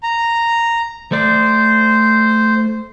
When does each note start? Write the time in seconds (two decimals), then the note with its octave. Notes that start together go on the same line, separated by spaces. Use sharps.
0.03 A#5
1.12 A3 C5 D5